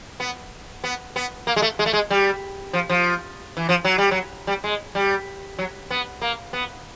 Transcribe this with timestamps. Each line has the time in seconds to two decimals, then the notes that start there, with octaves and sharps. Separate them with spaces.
0.20 B3
0.84 B3
1.16 B3
1.47 A#3
1.56 G#3
1.62 A3
1.79 G#3
1.86 A3
1.93 G#3
2.10 G3
2.73 F3
2.90 F3
3.57 E3
3.69 F3
3.85 F#3
3.98 G3
4.11 F#3
4.47 G3
4.64 G#3
4.95 G3
5.59 F#3
5.91 B3
6.22 A#3
6.53 B3